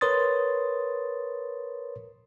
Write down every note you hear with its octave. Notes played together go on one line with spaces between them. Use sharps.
A#4 B4 C#5 C6 D#6 A6